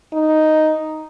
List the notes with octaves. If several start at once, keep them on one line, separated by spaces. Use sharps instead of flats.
D#4